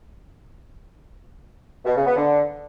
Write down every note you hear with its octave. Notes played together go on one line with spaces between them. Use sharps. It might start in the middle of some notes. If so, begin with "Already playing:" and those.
B2
C#3
B3
D3